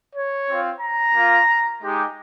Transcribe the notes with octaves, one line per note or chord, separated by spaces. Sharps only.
C#5
C4 F4
A#5
A#3 F4
G#3 D#4 G4